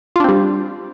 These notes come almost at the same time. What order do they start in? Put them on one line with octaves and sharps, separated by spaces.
F4 D4 C4 G3